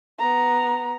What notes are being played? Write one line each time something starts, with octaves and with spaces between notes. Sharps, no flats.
B3 A#5